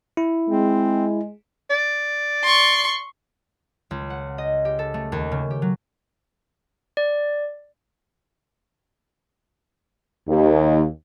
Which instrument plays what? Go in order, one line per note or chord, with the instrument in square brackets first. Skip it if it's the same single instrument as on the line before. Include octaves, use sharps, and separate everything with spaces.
[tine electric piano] E4
[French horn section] G#3 [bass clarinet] C4
[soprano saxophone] D5
[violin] C6 C#6
[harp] C#2
F#5
D#5
G4
A4
A3
D#2
C#3
G4
F#3
[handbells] D5
[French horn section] D#2